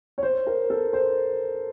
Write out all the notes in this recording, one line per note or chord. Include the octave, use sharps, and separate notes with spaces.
C#5
C5
A#4
A4
C5